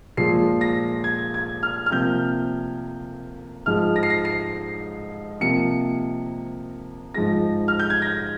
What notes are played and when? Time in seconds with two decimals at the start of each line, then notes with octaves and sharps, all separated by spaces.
0.17 A#2 F3 G#3 C7
0.61 A#6
1.04 G#6
1.34 G#6
1.63 F6
1.86 F6
1.91 C3 F3 A#3 G6
3.66 G#2 F3 G#3 F6
3.96 A#6
4.03 C7
4.10 A#6
4.25 C7
5.40 C3 F3 A#3 C#7
7.14 G#2 F3 G#3 A#6
7.68 F6
7.79 G6
7.90 G#6
8.02 A#6